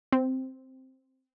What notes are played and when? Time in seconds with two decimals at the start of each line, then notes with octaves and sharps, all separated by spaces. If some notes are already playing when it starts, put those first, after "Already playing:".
0.12 C4